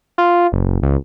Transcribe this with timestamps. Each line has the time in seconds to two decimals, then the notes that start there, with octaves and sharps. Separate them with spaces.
0.18 F4
0.52 F#1
0.82 C#2